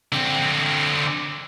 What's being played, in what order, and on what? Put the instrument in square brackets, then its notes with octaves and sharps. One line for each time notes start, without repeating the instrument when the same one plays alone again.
[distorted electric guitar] D3 C4